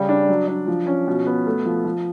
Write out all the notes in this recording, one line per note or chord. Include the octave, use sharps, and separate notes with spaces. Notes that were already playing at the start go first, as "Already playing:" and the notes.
Already playing: C#3 G3
D4
F#3
D4
F3
C#4
B2
B3
A3
F3
F3